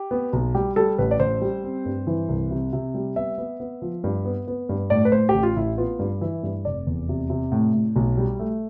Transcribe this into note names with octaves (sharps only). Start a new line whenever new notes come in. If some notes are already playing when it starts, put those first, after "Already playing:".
Already playing: G4
B3
B1
G3 G4
G3 A4
A1 B4
D5
A1 C5
G3
C4
G2
E3
C2
C3
C3
G3
B3 E5
B3
B3
F3
G2
B3
B3
G2
A2 D5
B4
A2 C5
G4
A1
F4
A1 E4
B3 F4
G2
E3 E4
G2
F1 D5
E2
C3
C3
A2
A2
B1
G3
A3